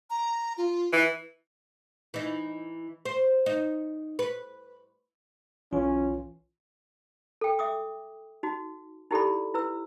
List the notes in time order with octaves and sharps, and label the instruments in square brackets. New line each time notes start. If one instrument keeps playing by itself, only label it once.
[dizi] A#5
F4
[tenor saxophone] E3
[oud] E3 D#4
C5
D#4
B4
[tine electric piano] B1 E3 F4 [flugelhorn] C#4
[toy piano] A4 G5
E5 D6 D#6
D#4 F#4
D#4 E4 G4 A4 D5 B5
E4 B4 E6